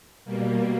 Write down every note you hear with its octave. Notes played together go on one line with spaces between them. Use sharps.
B2 G3 A#3